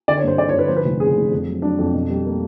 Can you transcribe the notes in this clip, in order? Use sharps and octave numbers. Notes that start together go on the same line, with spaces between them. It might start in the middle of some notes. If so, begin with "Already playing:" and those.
D3 D5
C#5
G2 C5
D3 D5
C#5
G1 B4
F3 C5
B4
F1
C#3 G#4
F1
F2
F#3
F#3 D4
F2
B2
G3
A#3